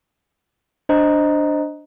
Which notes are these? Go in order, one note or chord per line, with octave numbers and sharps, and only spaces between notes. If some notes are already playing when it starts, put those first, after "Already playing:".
D4 C5 D#5 A#5